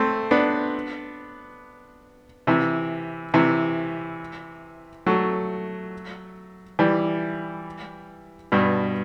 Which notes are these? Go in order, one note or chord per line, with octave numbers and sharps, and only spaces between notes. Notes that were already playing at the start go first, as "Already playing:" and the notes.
Already playing: A3 C4
B3 D4
C3 E3
C3 E3
F#3 A3
E3 G3
G2 B2